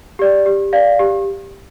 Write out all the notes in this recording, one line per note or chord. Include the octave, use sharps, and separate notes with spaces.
G4 D5
G4
D5 F5
G4